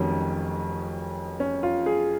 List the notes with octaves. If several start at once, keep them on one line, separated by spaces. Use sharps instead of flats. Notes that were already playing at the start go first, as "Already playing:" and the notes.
Already playing: F1 F2 D#3 F#3 C#4
C#4
F4
G#4